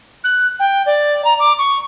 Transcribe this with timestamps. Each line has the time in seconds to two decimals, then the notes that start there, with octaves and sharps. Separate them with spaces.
0.24 F#6
0.60 G5
0.86 D5
1.25 A#5
1.39 D6
1.59 C#6